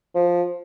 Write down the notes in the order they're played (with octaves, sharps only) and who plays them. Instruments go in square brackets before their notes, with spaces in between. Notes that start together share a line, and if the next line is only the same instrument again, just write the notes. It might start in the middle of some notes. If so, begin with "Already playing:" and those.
[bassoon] F3